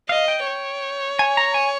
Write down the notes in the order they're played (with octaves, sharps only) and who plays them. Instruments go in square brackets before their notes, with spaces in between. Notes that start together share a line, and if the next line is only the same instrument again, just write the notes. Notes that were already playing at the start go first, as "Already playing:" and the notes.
[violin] D#5 [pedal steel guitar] F5
[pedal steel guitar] G5
[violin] C#5
[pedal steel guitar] G#5
A#5
G#5